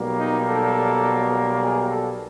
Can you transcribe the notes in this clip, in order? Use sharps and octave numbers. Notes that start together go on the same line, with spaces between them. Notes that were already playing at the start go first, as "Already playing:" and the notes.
Already playing: B1 B2 G3 A#3
D#4
A4
G#4
A4